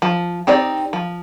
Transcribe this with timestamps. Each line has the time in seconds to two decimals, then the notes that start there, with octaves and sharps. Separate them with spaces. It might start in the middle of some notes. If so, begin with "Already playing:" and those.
0.02 F3
0.47 C4 D#4 G4 D5
0.93 F3